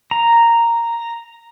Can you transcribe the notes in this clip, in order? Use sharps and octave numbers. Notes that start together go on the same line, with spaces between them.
A#5